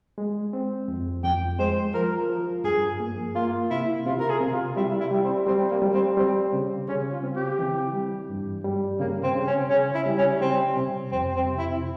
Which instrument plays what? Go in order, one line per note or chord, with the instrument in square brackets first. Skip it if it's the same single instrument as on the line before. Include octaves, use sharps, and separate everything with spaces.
[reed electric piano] G#3
C4
F2
[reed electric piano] F2 [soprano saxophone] G5
[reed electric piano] G#3 [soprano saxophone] C5
[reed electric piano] F3 [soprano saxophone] A#4
[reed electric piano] F3
[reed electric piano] G2 [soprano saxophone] G#4
[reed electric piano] A#3
[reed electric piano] A#3 [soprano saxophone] F4
[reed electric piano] C3 [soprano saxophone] E4
[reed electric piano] C3 [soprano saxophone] F4
[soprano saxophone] A#4
G#4
[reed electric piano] C3
[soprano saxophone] F4
[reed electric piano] G3 [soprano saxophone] E4
[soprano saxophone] E4
[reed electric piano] G3
[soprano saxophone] C4
[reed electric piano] G3 [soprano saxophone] C4
[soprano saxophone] A#3
[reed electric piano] G3
[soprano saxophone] C4
[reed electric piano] G3 [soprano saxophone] C4
[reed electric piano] C#3
[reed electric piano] C#3 [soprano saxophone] C#4
[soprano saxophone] F4
[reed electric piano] C4
[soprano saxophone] G4
[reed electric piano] E3
G3
G2
G3
[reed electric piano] C#3 [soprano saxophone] A#3
[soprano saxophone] C4
[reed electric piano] C#3
[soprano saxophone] C#4
[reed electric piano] C#3 [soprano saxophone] C#4
[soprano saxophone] E4
[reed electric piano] G3
[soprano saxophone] C#4
[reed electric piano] G3 [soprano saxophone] C4
[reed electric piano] C3
[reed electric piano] F2 [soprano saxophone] C4
[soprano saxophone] C4
[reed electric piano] C3
[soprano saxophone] E4